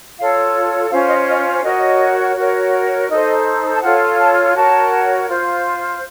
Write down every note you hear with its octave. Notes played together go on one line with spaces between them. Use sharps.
F4 A4 C#5 F5
C#4 F4 C5 F5
D#5
C#5
D#5
F#4 A#4 C#5 D#5
F#4 A#4 C#5
D#4 A4 C5 D#5
A5
F4 A4 C#5 F#5
A5
F#4 A#4 C#5 A5
F4 C5